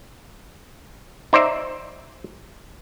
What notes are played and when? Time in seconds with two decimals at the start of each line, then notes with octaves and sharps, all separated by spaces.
1.33 D#4 C5 D5 E5